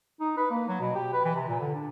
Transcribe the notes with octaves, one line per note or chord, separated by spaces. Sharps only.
D#4
B4
A#3
F#3
B2
G4
B4
E3
C3
A#2
D3
D4